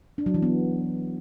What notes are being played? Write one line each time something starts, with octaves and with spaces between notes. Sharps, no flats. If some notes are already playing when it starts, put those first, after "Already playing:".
D4
F#3
E3
B3